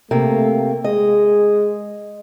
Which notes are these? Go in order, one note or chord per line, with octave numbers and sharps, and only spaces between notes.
C3 A3 A#3
G#3 D#5